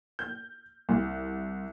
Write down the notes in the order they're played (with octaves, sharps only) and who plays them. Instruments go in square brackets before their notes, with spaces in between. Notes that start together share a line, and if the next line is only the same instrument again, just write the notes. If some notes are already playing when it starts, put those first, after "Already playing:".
[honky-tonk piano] G6
C2